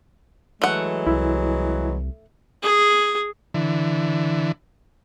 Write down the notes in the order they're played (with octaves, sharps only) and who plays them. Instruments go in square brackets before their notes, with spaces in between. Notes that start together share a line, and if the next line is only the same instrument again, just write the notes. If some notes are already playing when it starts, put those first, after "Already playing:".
[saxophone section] E3 F#3 G#3 [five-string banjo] A3 F#5
[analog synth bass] C2 [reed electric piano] E4
[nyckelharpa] G#4
[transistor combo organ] D3 E3